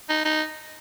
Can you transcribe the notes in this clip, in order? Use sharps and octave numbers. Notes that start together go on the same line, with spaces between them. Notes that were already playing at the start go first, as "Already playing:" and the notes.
D#4
D#4